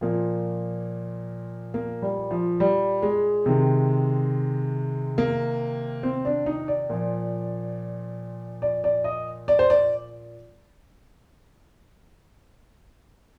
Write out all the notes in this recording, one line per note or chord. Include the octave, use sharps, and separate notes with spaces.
A#2 F3 A#3
A#3
G3
F3
G3
G#3
C3 D#3
A#3
C4
D4
D#4
D5
A#2 F3
D5
D5
D#5
D5
C5
D5